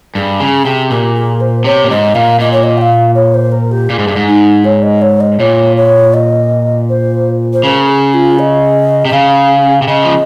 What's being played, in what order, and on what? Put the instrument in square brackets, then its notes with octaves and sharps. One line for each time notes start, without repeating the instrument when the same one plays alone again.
[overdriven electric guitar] G2 [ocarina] G#4
[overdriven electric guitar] C#3
C3
[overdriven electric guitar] A#2 [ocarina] G4
[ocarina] G#4
C5
[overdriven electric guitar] C3 [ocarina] C#5
[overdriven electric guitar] A#2
[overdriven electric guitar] G#2 [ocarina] D#5
[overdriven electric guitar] A#2 [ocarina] F5
[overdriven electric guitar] A#2 [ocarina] D#5
[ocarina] C#5
D#5
G5
F5
C#5
C5
A#4
G4
[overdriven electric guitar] A#2 [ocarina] G#4
[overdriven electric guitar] G#2
G2
G#2
[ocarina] D#4
C#5
D#5
C#5
D#5
[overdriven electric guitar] A#2 [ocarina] C#5
[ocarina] C#5
D#5
C5
C5
[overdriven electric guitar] C#3 [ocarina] A#4 C5
[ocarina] G#4
F4
D#5
[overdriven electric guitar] C3
[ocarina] D#5
[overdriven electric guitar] C#3 [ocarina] F5
[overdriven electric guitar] C3
[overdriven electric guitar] C#3 [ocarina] D#5
[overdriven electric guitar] F3